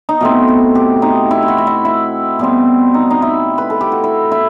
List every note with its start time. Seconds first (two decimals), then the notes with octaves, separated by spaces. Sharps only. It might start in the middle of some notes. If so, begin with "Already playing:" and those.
0.09 D#4
0.21 B2 A3 C4 E4
0.48 F#4
0.75 G4
1.02 D#4
1.31 E4
1.43 E4
1.48 F#4
1.58 F#4
1.67 E4
1.85 E4
2.39 B2 G3 C4
2.94 D#4
3.11 D#4
3.22 E4
3.58 B4
3.70 A4
3.81 G4
3.92 F#4
4.04 E4
4.32 E4